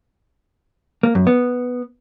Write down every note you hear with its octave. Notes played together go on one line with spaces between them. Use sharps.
A#3
F#2
B3